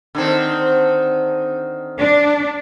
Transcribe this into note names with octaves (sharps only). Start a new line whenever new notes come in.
D3 D#3 C4
D4